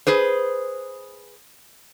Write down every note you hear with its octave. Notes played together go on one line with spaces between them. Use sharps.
G#4 B4 C5